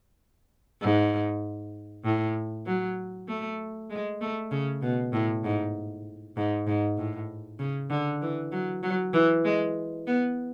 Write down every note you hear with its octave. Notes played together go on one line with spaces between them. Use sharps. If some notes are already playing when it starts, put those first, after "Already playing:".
G#2
A2
F#3
A3
G#3
A3
C#3
B2
A2
G#2
G#2
G#2
A2
C#3
D3
E3
F#3
F#3
E3
G#3
B3